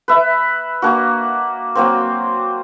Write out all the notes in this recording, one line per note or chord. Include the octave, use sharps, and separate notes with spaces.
B4 E5
A#3 D4 F#4
F#3 A#3 C4